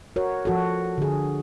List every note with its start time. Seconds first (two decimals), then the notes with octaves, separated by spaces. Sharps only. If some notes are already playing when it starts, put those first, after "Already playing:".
0.16 F#4 A#4 C#5
0.45 F3 F#4 A4
0.98 D3 G#4